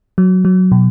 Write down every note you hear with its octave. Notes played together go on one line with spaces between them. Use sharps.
F#3
F#3
B2